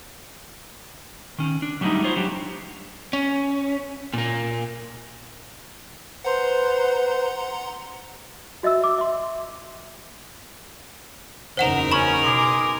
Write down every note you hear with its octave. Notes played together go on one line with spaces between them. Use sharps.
D#3 C#4
D4
F#3 G3 A3 C#4 D#4 E4
D#4 F4 C5 C#5
F#3 D4 G4
C#4
A#2 A#3
B4 C5 F#5 A#5 C6
F#4 D#5 E5 E6
D6
E5 C6
F#1 E2 D#4 A#4 C5 F#5 E7
C#4 B5 C#6
B2 G#4 C6 D6